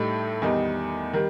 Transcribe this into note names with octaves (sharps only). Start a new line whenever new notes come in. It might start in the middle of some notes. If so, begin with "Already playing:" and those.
Already playing: A2 G3 D#4 A4
E2 D#3 G3 D#4
D#3 G3